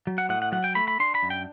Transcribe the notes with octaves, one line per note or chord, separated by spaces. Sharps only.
F#3
F#5
A2 F#5
F#5
F#3 F#5
G5
A3 B5
B5
D4 C6
B5
F#2
G5